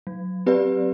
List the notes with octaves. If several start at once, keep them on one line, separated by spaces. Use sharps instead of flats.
F#3
C4 G4 B4 D5